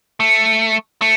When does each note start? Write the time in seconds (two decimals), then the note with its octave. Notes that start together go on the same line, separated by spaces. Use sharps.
0.20 A3
1.02 A3